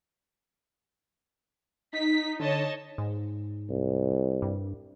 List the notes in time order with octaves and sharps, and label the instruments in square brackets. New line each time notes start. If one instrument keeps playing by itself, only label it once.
[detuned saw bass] D#4 [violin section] B6
[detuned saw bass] D3 [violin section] C#5 D#5 A5
[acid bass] G#2
[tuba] C2
[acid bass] G2